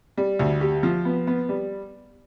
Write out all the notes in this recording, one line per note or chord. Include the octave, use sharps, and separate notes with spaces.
G3
D2
G4
F3
B3
B3
G3